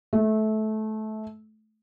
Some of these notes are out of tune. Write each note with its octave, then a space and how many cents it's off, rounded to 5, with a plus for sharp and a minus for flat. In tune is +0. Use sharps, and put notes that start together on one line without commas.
A3 -20